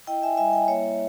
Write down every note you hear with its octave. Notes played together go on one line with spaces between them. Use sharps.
E4 D#5 G5
E5 G#5
G3 E5 G#5
D#5 G5
A#3 C#5 E5